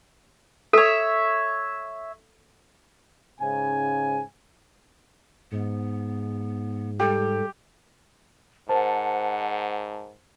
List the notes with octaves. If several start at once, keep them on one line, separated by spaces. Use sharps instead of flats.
A4 C#5 E5
G#2 C#3 G#5
G#2 B3
G3 G4 A4
G#2 A#4 C5 F#5 A5